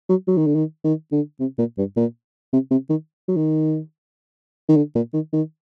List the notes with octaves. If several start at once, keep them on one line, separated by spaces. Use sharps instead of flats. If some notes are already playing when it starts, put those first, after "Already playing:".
F#3
F#3
D#3
D3
D#3
D#3
D3
C3
A#2
G2
A#2
C3
C3
D#3
F#3
D#3
D#3
D3
A#2
D#3
D#3